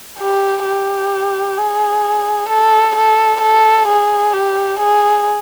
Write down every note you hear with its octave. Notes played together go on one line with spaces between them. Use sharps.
G4
G4
G#4
A4
A4
A4
G#4
G4
G#4